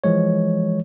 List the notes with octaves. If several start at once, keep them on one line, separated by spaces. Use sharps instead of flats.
E3 F3 G#3 C#5